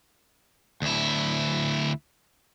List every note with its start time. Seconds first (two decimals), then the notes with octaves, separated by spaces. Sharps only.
0.82 D2 E4